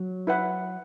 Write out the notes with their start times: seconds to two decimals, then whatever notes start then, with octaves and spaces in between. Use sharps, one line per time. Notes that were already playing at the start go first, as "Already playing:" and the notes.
Already playing: F#3
0.27 E4 B4 F#5 B5